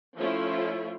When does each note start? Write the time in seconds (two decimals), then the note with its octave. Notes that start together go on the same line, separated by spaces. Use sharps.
0.16 F3 A3 C#4 E4 F4